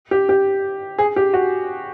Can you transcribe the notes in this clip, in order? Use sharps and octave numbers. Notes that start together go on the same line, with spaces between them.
G4
G4
G#4
G4
F#4